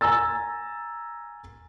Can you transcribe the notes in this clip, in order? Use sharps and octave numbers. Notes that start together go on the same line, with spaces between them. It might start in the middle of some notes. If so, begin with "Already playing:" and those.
G#5 A#5 E6 A6